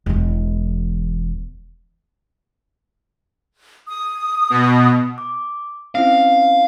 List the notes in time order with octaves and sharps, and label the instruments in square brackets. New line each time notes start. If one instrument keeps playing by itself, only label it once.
[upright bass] E1 E2
[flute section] D#6
[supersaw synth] B2
[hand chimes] D6
[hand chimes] C4 C#4 E4 [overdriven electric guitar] F5